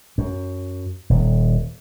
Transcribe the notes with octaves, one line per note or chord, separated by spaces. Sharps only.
F#2
D#1